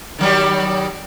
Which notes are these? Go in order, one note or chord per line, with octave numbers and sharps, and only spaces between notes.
D#3 F#3 G3